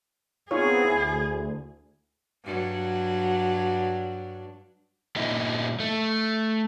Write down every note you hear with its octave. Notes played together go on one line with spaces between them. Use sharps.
B3 C4 D#4 F4 G#4 C#5
D2 E4
G2 F#3 D4
A#2 G3 D#4 E4
A3